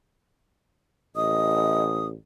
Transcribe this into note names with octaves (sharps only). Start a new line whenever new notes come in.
A1 D#5 D#6